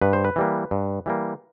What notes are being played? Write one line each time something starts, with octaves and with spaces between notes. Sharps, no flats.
G2 B4
C5
B4
E3 G3 A#3
G2
E3 G3 A#3